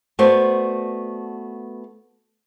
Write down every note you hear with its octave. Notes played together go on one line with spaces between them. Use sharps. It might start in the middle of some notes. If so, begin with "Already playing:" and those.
A3 B3 F#4 C5 D5 A5